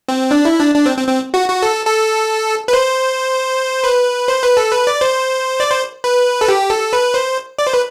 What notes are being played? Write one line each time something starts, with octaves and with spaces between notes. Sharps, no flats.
C4
D4
E4
D4
D4
C4
C4
C4
F#4
F#4
A4
A4
B4
C5
B4
C5
B4
A4
B4
D5
C5
D5
C5
B4
A4
G4
A4
B4
C5
D5
C5
B4